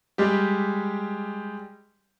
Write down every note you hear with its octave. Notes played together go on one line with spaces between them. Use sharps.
G3 G#3 G4